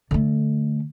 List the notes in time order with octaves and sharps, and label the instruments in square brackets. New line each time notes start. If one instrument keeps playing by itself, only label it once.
[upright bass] D3 A3